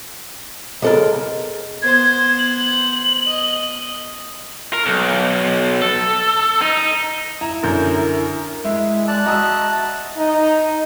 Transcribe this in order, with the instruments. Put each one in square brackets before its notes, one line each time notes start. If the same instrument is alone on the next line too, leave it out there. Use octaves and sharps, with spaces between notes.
[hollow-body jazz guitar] B1 A4 A#4 [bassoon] G#3
[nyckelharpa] B3 C5 [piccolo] G#6
[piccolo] F#7
[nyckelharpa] D#5
[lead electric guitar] A#4
B1
A4
D#4
[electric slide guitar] E4 [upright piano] A#5
[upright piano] F#2 D3 G6 [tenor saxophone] A#4
[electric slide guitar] G#3 [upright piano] E4 [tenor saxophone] E5
[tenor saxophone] D5 [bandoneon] A5 F#6
[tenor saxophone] F#4 [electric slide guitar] D#5 E5 [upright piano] A#5 D#6 E6
[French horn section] D#4